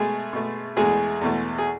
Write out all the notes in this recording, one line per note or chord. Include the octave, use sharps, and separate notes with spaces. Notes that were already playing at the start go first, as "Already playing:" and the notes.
Already playing: B2 G#3 A3 G#4
B2 A3
E2 B2 G#3 A3 G#4
E2 B2 A3
G#4